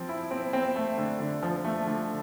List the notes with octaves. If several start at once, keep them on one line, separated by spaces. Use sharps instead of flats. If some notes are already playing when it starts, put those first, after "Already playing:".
Already playing: F3 C4
E4
C4
C4
A3
D3
D3
F3
A3
D3